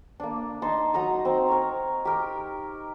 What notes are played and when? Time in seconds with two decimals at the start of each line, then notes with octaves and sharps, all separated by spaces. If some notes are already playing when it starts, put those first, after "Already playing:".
0.20 A#3 D4
0.62 D#4 A5 C6
0.94 F#3 D#4 A#5 D#6
1.25 C4
1.48 A#4 C#5
2.05 G4 A#4